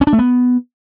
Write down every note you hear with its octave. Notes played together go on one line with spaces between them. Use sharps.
C#4
D4
A3
B3